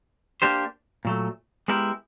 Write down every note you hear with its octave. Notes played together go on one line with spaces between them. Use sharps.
A#3 D4 G4 C5
A#2 F#3 A3
G#3 B3 E4 G4 A#4